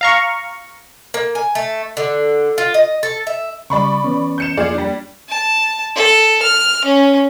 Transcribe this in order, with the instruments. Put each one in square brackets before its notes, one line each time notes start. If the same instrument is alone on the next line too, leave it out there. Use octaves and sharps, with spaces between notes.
[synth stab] F5 A#5 C#6
[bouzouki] A#3
G#5
A3
D3
F4
D#5
A4
E5
[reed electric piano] C#3 G3 [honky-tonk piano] D5 B5 C#6
[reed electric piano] E3 B3 C#4
[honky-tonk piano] G6 C#7 E7
[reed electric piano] F2 A#3 G#6 [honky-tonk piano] F4 G#4 D5
[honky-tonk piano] G3 D4
[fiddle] A5
A4
F6
C#4